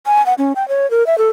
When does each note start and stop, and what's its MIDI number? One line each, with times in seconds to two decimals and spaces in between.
0.07 0.25 80
0.26 0.34 78
0.38 0.53 61
0.56 0.67 79
0.69 0.89 73
0.91 1.06 70
1.07 1.18 76
1.18 1.30 69